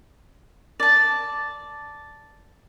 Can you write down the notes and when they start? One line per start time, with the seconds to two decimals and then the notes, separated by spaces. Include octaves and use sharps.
0.80 D5 A5